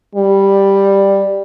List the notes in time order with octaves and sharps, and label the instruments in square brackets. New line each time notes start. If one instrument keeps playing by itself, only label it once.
[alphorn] G3